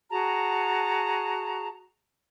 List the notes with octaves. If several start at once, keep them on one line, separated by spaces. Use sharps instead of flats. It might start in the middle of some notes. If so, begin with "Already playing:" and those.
F#4 G#4 A5 A#5